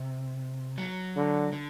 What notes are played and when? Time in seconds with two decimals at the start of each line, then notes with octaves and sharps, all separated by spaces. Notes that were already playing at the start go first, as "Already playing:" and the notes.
Already playing: C3
0.78 F#3
1.16 D3
1.53 D3